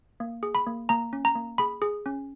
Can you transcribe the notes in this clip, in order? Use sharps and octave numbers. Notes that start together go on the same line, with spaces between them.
A#3
G#4
B5
A#3
A#3 A#5
C#4
A#5
A#3
G#4 B5
G#4
C#4